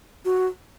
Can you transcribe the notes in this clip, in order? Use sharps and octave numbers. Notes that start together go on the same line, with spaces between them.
F#4